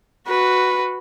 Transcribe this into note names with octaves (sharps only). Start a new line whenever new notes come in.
F#4 B4